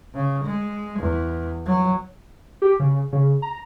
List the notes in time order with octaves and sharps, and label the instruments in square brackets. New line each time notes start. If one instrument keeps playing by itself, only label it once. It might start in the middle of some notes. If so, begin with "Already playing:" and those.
[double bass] C#3
G#3
E2
F#3
[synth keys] G4
C#3
C#3
A#5